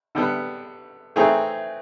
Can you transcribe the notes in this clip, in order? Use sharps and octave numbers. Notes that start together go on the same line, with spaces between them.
D3 G3 B3
E3 A3 C4 D#4 G#4